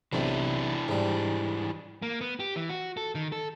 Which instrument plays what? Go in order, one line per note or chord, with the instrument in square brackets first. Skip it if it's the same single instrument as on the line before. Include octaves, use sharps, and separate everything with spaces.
[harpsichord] B1 C3 [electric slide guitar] E3 D4
[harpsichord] G#2 G3
[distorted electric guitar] A#3
B3
G4
E3
F#4
A4
D#3
A4